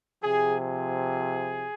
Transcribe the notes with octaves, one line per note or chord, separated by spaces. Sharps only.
C3 F3 G#4
G#4